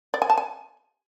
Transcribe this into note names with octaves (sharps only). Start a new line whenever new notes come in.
D5
G#5
A5
G#5